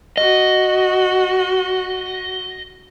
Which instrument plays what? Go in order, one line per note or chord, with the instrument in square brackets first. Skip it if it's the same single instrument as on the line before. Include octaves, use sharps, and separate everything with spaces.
[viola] F#4 [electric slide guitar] D#5